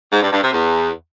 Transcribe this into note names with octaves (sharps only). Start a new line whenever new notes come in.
G#2
G2
G2
C3
E2